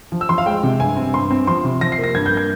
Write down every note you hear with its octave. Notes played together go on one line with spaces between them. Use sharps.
F3
E6
F3 C6
F5
G#3 G5
C3
G2 G#5
C4
G2 C6
C4
F3 C6
C3
F3 A#6
C7
A#3
A#6
G2 G#6
G6
A#3
G#6